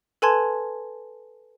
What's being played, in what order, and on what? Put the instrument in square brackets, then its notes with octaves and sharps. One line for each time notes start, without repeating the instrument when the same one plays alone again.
[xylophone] A4 B4 G#5 A5 C6 G#6